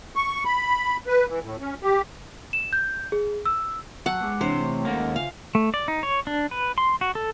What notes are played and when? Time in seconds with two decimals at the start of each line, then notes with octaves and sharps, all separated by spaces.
0.16 C#6
0.45 B5
1.07 B4
1.28 E3
1.42 A2
1.59 C#4
1.83 G4
2.53 E7
2.73 G6
3.12 G#4
3.45 E6
4.06 F#3 F#5 A5 C#6 E6
4.21 G#3 B3 G#4 D6
4.41 C3 E3 D4 C5 C#5
4.59 A3 C#5 C#6
4.85 D#2 G#3 A#3 C#4 A4 F#5
5.16 C#3 F4 E5 F5 G#5
5.55 A3
5.74 D5
5.88 D#4
6.03 C#5
6.27 D4
6.51 B4
6.78 C6
7.01 F#4
7.15 A4